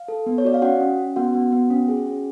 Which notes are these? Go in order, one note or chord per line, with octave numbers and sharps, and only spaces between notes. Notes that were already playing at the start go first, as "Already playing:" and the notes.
Already playing: F5
A4
B3
C#5
F#4 D5
F5
C#4 F#4 F#5
C#4
C#4
B3 F#4 F#5
B3
B3
C#4
G#4
C#4